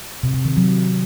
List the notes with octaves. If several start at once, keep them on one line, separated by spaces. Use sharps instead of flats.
C3
C3
D#3
F#3